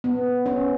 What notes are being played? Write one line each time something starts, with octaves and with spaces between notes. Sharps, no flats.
B3
C#4